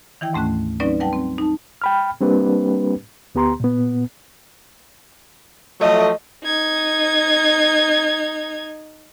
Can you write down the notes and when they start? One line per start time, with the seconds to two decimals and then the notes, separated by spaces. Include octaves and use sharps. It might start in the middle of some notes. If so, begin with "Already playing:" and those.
0.21 D#3 E3 E4 G5
0.33 D2 G#2 A3 C#4 F#6
0.80 F#3 C4 C#4 D#4 B4 D5
1.00 G3 B4 F#5 G5 A5
1.13 C4
1.38 D#4 A5
1.82 G5 B5 F6
2.21 G3 A#3 C4 D4 G4 B4
3.35 D2 B3 G4 A#5 C6
3.60 A#2 B3
5.81 F3 F#3 A3 D#5
6.44 D#4 G#6